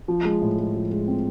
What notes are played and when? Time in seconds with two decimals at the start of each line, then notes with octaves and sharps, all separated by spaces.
0.08 F3
0.25 G#3
0.41 A2
0.58 G#3
0.75 F3
0.91 G#3
1.08 C4